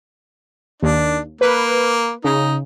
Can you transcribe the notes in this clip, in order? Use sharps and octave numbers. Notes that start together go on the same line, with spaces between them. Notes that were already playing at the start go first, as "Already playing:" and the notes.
D#2 D4
A#3 B4
C#3 D#4